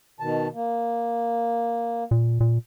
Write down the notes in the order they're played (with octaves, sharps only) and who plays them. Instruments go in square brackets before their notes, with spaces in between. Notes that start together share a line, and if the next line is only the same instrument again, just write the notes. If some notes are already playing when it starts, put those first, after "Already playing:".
[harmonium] B2 D#3 A5
A#3
[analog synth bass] A#2
A#2